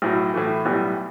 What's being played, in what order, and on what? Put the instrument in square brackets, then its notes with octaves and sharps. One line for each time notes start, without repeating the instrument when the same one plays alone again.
[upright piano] B1 A2 F#3
A2 E3 A3
B1 A2 G3 B3